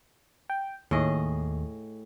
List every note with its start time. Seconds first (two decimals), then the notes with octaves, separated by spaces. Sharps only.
0.50 G5
0.91 D#2 A2 G#4 D#5